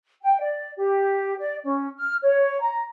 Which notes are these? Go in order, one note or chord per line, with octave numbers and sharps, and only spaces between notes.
G5
D5
G4
D5
C#4
F6
C#5
A#5